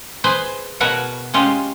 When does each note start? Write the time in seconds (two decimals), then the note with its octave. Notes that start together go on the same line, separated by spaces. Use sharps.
0.24 G#4 B4 C5
0.80 B2 F#4 A#4 B4 C#5 F#5
1.34 G#3 C#4 F4 G4